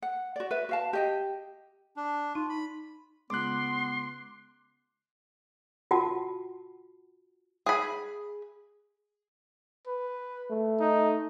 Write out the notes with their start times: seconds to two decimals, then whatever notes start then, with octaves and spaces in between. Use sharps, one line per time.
0.02 F#5
0.36 F#4 D5
0.51 B4 E5
0.69 F#4 F5 A5
0.93 G4 D#5 G5
1.96 D4
2.35 D#4 F4
2.50 B5
3.30 C#2 B3 C6 D6 F#6
5.91 F4 F#4 F#5 A5
7.66 G#4 B5
9.87 B4
10.50 A3
10.80 D#4